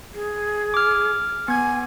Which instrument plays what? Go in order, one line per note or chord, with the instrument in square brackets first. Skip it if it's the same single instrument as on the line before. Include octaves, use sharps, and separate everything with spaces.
[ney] G#4
[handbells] D6 F6
[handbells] B3 G#6 [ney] G#5